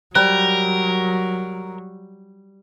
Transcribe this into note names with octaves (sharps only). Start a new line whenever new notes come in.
F#3 G3 A#4 C5 D5